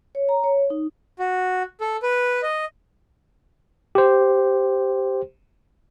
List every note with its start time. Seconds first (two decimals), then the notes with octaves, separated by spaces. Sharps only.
0.15 C#5
0.29 A#5
0.44 C#5
0.70 D#4
1.19 F#4
1.81 A4
2.03 B4
2.43 D#5
3.95 G4 C5